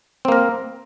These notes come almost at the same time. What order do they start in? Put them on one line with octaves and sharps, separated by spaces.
C4 A#3 A#4